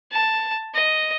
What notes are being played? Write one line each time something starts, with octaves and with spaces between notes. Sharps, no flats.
A5
D#5